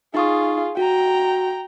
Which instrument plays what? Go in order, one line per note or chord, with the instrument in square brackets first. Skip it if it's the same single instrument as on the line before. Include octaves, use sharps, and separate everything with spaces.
[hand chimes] D#4 C#6 D#6 [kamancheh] F4 G#4
[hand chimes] F#4 [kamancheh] G5 A#5